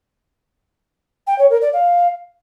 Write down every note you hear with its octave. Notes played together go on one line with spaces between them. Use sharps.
G5
C#5
A#4
D5
F5